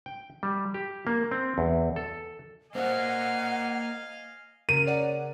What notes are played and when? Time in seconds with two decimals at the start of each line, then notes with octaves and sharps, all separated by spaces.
0.06 G5
0.43 G3
0.74 G4
1.07 A#3
1.31 C4
1.58 E2
1.96 A4
2.75 A#3 A#4 C5 D5 D#5 F5 F#5 G#5
4.69 C#3 A#4 D#7
4.86 C#5 D5 F#5